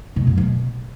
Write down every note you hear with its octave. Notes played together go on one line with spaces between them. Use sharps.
B2
F#2
B2